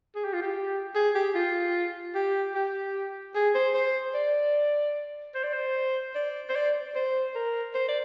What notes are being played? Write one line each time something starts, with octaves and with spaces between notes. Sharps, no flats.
G#4
G4
F4
G4
G#4
G4
F4
G4
G4
G#4
C5
C5
D5
C5
D5
C5
D5
C5
D5
C5
A#4
C5
D5